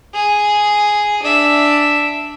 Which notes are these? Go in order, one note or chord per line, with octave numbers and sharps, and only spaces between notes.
G#4
D4 E5